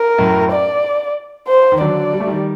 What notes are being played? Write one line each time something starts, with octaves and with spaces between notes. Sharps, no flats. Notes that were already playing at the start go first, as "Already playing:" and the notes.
Already playing: A#4
F#2 A2
D5
C5
D#3
D3 F#3 D5
G3
A3
D#3 G3